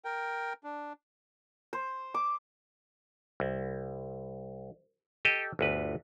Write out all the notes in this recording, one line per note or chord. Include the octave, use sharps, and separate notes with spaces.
A#4 G5
D4
C5
D6
C2
G4 A4 D#5
G1 D2 B4